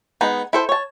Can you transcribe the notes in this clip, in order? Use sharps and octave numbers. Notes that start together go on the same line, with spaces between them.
G#3 B3 D#4
E4 A4 C5
C#5 A5